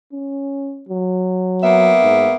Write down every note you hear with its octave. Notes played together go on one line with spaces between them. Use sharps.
C#4
F#3
A#3 B3 E5
G#2